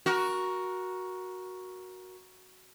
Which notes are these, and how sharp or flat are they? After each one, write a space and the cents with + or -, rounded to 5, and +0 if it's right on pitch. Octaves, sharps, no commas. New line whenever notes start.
F#4 +0 A#4 +15